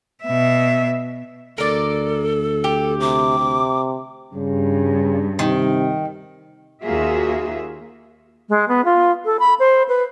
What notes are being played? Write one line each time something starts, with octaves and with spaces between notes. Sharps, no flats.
B2 E5
D2 A4 A#4 D5
G4
C3 D6
C3
G2 C#3
C3 D#3
D#2 A#3 F4 F#4 G#4 E5
G#3
B3
F4
A4
B5
C5
B4